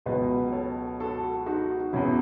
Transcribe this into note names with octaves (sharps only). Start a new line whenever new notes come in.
C#2 B2 F#3 B4 D#5
A4 C#5
F#4 A4
D#4 F#4
E2 B2 F#3 C#4 E4